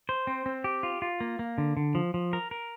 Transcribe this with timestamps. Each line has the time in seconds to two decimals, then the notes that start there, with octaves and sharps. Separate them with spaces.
0.09 C5
0.27 C4
0.46 C4
0.64 G4
0.83 F4
1.02 F4
1.21 A#3
1.39 A#3
1.58 D3
1.77 D3
1.95 F3
2.14 F3
2.33 A#4
2.51 A#4